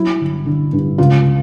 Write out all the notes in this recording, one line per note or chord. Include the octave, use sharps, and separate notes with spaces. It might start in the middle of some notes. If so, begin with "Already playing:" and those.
Already playing: F#3 E4
G1
D3
G2
C#2 F4